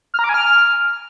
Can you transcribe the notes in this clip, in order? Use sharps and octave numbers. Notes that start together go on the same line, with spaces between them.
F6
A#5
D6
G#5
F6